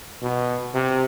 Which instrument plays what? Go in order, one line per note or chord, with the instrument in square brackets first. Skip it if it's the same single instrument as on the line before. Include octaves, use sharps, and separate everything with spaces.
[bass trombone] B2
C3